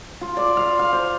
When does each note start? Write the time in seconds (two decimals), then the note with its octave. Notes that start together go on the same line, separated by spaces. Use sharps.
0.21 F4
0.37 D5
0.57 F5
0.79 F5
0.93 C5